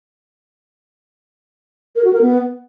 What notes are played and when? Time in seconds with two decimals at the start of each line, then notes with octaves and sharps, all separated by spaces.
1.96 A#4
2.04 F#4
2.13 A#4
2.22 B3